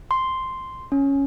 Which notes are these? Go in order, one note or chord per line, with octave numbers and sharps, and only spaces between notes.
C6
C#4